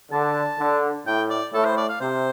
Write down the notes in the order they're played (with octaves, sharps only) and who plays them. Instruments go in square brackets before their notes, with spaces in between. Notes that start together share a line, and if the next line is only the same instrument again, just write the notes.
[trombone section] D3 [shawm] A5
[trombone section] D3
[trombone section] A2 [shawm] G5
[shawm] D5
[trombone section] A2 [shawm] A4
[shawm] C5
D5
F5
[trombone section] C3 [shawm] C5